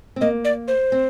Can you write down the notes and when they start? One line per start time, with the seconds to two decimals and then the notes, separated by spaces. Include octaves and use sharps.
0.16 C4
0.21 A#3 D#5
0.45 D5
0.68 C5
0.92 C4